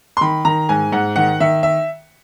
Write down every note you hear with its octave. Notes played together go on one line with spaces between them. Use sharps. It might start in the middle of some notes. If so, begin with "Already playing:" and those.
C6
D#3 B5
D#3 A#5
G#2 G#5
G#2 F#5
D#3 F#5
D#3 E5
E5